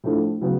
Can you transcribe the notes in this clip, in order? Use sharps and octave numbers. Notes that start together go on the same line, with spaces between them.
A2 F3 A3 D4
C#3 F#3 B3